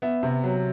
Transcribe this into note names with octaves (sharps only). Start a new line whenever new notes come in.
B3 E5
C3
F#3